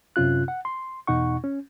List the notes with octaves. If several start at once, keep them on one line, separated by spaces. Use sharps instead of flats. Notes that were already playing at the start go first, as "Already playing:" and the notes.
F#2 C3 C#4 F4 F#6
F#5
C6
E2 B2 D#4 F#5 C#6
C#4